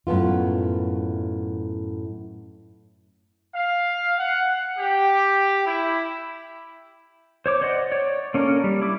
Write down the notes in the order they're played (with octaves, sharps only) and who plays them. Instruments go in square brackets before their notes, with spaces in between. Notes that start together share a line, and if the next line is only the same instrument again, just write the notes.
[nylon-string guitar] F#2 A2 B3 F4
[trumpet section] F5
F#5
G4
E4
[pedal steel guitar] C5 C#5 D6
C5 D5 D#5 F#5
C#5 D5
A#3 C#4 D4 A4 A#4
G3
E4 D6